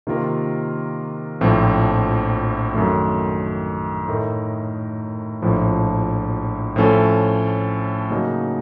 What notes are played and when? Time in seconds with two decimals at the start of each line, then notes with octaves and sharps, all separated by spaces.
0.07 C3 D#3 A#3 F4 A#4
1.41 A#1 A2 F3 C4
2.74 F#2 D#3 A3
4.08 A2 A3 D#4 A#4
5.42 A#1 A2 F3
6.76 A2 F3 A3 C#4 A4
8.11 C#3 F#3 A#3 D#4